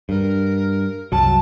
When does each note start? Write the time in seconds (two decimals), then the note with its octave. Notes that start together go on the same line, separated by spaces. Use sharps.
0.09 G2 A#4
1.12 C2 F#2 F#3 A5